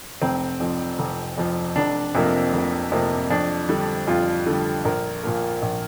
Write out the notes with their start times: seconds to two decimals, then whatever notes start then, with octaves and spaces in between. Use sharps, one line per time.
0.22 F1 C4
0.60 F2 F3
0.99 F1
1.38 F2 F3
1.76 F1 D4
2.15 F2 C3 F3 A#3
2.53 F1
2.92 F2 C3 F3 A#3
3.30 F2 D4
3.69 D3 G3
4.07 F2 F4
4.46 D3 G3
4.85 A#1 A#4
5.23 A#2 F3 A#3
5.62 A#1